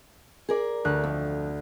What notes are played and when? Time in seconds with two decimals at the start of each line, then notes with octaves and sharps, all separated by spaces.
0.49 G#4 A#4 D5
0.85 D2 F#6
1.04 F2